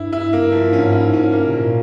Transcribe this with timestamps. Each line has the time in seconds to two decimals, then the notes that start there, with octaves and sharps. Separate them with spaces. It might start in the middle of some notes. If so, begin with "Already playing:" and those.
Already playing: G2 E4
0.13 E4
0.32 G2 A#3
0.52 F3
0.73 G#2 C#4
0.92 E4
1.13 G#2 C#4
1.33 A#3
1.47 C3
1.53 A#2 A#3